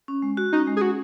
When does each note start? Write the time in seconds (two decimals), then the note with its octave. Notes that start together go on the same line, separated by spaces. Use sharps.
0.08 C#4
0.22 G#3
0.37 F#4
0.52 C#4 D#4
0.67 G#3
0.77 G#4
0.81 C#4 F#4